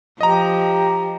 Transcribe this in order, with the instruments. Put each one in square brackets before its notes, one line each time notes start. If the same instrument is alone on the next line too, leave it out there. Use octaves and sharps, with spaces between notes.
[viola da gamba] F3 [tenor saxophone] G4 [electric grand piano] D#5 A#5